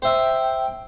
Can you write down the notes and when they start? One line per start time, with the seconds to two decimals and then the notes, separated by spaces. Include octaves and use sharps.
0.02 C5 E5 G5